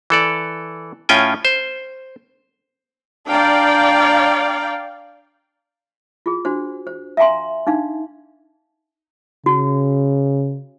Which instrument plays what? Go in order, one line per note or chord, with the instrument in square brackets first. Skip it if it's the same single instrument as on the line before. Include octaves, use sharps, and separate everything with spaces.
[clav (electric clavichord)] E3 A4 D5
A2 C#4 F4 G5 G#5
C5
[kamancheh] D4 A#5 [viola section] D5 F5 G5
[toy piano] F4 G#4
D4 F#4 C5
C5
E5 F5 G#5 A#5 C6
D4 D#4 F5
[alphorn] C#3 [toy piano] F#4